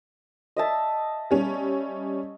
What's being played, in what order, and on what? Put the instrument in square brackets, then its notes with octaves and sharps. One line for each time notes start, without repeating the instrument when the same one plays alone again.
[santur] D#5 E5 A5
[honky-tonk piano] G3 C#4